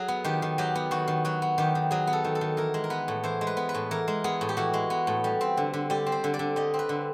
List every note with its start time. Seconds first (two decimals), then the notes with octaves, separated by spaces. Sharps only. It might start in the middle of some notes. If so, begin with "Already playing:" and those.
Already playing: F#3 G#4
0.08 B3
0.24 D#3 G4
0.42 D#3
0.58 F#3 G4
0.75 B3
0.91 D#3 F#4
1.08 D#3
1.25 F#3 F#4
1.42 B3
1.58 D#3 G4
1.75 D#3
1.91 F#3 G#4
2.07 B3
2.13 A4
2.24 D#3
2.35 A4
2.41 D#3
2.57 E3 A#4
2.74 G#3
2.84 A#4
2.90 B3 B4
3.08 A2
3.24 E3 C5
3.41 G#3
3.47 B4
3.57 B3
3.69 B4
3.74 A2
3.91 E3 A#4
4.08 G#3
4.24 B3 G#4
4.41 A2
4.49 G4
4.57 E3 F#4
4.74 G#3
4.90 B3
5.07 A2
5.24 G3
5.41 C4
5.57 D3
5.73 D3
5.90 G3 G4
6.06 C4
6.12 C5
6.24 D3
6.34 D5
6.39 D3
6.56 G3 D#5
6.74 C4
6.79 B4
6.89 D3